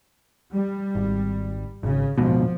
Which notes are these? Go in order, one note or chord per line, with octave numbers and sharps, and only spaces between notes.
G3
G#1
G#1 C#3
D1 G#2 B2 F3